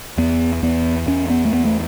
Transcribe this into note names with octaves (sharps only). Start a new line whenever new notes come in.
E2 B3
E2 B3
E2 C#4
B3
A3
E2 B3
A3